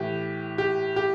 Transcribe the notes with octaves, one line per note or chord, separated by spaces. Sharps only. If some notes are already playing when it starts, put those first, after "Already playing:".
Already playing: A2 E3 G4
G4
G4